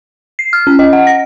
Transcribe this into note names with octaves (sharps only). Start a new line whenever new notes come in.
C7
F6
C#4
D#5
F#5
A#6